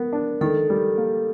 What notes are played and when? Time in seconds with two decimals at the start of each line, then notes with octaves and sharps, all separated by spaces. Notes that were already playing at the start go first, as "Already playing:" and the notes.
Already playing: B3 A#4
0.13 D4
0.41 D#3 A4
0.70 G3
0.98 A#3